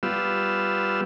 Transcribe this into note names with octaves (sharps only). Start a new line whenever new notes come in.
G3 B3 F4 E6